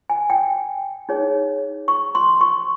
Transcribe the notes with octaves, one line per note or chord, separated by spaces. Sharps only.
G#5
G5
D#4 G#4 C#5
C#6
C6
C#6